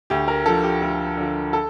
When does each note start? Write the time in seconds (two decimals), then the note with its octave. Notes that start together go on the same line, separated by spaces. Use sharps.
0.10 D2 G4
0.28 A#4
0.46 D3 F3 A4
0.64 G4
0.82 D2 F4
1.17 D3 F3
1.53 A4